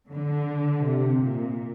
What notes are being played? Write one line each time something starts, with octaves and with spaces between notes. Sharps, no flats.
D3
C3
A#2